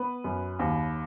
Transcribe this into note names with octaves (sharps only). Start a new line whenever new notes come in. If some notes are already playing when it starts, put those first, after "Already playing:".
Already playing: B3 B4
F#2
D#2